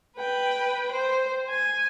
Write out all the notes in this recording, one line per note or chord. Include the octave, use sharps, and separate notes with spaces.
B4 G5
C5
G#5